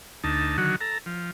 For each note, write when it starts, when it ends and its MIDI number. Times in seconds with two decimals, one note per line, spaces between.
0.24 0.57 38
0.24 0.57 63
0.24 0.57 81
0.58 0.76 50
0.58 0.76 51
0.58 0.76 54
0.58 0.76 66
0.81 0.98 69
0.81 0.98 82
1.06 1.31 53